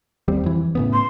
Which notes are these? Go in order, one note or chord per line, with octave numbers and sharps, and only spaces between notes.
D#2 G3 C4
F2 E3
A2 C#3 B3
C6